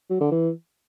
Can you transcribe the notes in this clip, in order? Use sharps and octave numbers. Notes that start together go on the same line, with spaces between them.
F#3
D3
E3